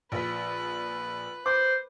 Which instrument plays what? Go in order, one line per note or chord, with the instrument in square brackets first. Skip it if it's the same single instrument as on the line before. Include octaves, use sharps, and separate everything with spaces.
[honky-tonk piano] A#1 B6 [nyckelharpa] B4
[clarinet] C5 [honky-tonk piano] D6